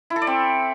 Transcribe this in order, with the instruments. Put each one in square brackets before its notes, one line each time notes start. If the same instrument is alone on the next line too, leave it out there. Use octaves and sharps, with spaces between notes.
[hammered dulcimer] E4
A4
D5
C4